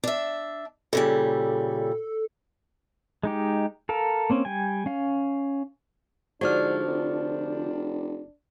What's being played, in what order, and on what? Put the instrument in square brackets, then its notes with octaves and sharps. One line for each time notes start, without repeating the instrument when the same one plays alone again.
[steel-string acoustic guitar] D4 E5
[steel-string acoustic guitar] A#2 C#3 G3 [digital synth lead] A4
[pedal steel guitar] G#3 D#4 G4
A4 A#4 F5
A#3 C4 C#4
G3 G5 G#5
C#4 F5
[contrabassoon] G#2 [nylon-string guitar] D3 F3 [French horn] D4 [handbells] F#4 D5 F6
[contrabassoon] F1